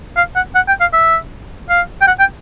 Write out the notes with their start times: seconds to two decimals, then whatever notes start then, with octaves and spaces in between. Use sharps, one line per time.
0.17 F5
0.36 F#5
0.55 F#5
0.68 G5
0.81 F5
0.93 E5
1.69 F5
2.01 G5
2.07 F#5
2.19 G5